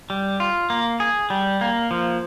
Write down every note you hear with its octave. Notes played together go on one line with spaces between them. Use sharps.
G3
F4
A#3
G#4
G3
A#3
F3